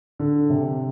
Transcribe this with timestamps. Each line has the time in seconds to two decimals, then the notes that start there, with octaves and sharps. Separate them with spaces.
0.20 D3
0.50 C3